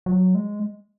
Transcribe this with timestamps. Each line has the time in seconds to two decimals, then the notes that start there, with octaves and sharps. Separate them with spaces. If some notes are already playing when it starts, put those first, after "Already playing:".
0.06 F#3
0.35 G#3